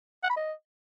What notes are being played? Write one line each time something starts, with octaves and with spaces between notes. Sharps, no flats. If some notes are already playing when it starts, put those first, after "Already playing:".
F#5
B5
D#5